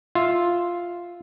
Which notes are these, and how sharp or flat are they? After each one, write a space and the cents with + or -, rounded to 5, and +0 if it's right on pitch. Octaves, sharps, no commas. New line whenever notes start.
F4 +0 E5 +0